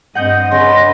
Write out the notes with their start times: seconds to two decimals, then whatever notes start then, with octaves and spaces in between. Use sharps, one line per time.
0.15 G2 C4 D#5 F#5 G6
0.51 C#3 D4 B4 D#5 C6